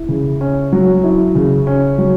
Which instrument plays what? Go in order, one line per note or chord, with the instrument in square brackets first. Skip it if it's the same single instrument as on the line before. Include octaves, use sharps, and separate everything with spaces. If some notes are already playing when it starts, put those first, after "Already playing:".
Already playing: [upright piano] E4
C#3
C#4
F#3
E4
C#3
C#4
F#3